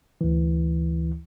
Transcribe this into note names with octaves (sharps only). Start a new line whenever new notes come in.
D2 E3